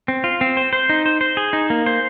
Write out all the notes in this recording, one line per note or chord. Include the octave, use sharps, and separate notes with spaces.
C4
F4
C4
C5
C5
D#4
C5
C5
G#4
D#4
A#3
C5